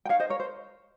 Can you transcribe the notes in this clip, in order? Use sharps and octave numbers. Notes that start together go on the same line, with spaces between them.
G5
D#4 C#5 F5
C5 D#5
A#4 C#5
C5